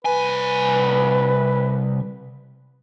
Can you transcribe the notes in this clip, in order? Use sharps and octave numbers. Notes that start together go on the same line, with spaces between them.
C2 B4 G#5